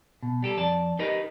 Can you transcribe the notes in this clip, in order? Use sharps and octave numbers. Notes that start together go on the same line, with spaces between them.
B2
G3 G4 A4
F2 D5 A5
D#4 G4 A#4 B4 D#5